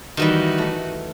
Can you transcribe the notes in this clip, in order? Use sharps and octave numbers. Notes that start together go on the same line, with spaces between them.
D#3 E3 G3 D#4 F#4
A3